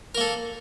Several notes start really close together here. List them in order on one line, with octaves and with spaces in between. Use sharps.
A#4 A#3 A4